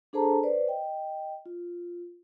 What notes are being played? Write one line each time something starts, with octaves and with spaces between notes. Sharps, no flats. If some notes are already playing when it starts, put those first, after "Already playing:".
D4 G#4 A4 C5 A5 A#5
B4 C5 D5
D#5 G5
F4